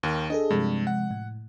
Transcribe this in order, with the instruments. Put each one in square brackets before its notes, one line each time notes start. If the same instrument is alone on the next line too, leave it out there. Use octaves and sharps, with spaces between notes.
[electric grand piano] D#2 D#3
[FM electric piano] D4 G#4 A4 [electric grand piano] D#5
[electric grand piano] G2 [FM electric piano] C3 F3 G#3
[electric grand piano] F#5
[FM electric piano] A2